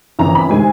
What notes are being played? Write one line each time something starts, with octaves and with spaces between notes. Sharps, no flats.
G1 F2 C#3 E3 A#5
B5
C3 D#3 G#3 G#5